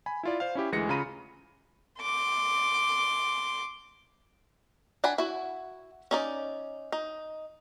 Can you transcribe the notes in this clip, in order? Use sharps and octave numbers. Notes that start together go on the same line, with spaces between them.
G#5 B5
E4 F4 D5
C5 F5
C#4 E4 G4
D2 E3 G#3 A#6 C#7
C#3 F4 A#5 B5 D#7
C6 D6
D4 F#5 G#5 B5
E4 F#4
C#4 D#4 D5
D#4